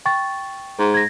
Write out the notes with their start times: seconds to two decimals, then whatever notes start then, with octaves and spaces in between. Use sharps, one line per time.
0.05 G5 C#6 A6
0.79 G#2
0.94 G#6 A#6